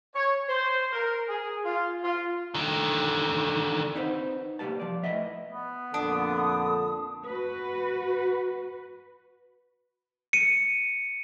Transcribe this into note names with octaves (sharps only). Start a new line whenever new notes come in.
C#5
C5
A#4
G#4
F4
F4
D3 D#3
C4 D#4 B4 C5
C2 A#2 C#3 G3 B4 A5
F3 D5
A2 B4 D#5 E5
B3
F2 A#2 D3 D4 D#6
F#4 B4
C#7 D#7